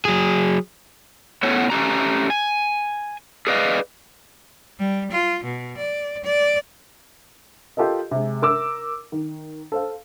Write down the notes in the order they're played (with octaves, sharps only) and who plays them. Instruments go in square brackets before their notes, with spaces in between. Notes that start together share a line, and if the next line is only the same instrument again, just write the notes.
[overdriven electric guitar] F#3 G#4
[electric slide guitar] A2 B3 C#4 A4 C#5 F#5
A3 C#4 G4 A#5
G#5
G#4 B4 D5 D#5 F5
[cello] G3
F4
B2
D5
D5
[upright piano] F4 G4 A4 A#4 D#5
C3 G#3
A#4 D6 E6
D#3
A4 C5 F5